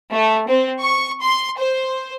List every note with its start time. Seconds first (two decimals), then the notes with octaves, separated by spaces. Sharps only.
0.13 A3
0.49 C4
0.81 C#6
1.22 C6
1.59 C5